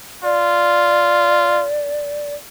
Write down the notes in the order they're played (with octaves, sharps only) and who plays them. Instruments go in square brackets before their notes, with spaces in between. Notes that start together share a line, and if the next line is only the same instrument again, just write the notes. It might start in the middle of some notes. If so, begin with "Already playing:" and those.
[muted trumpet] F4 [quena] D5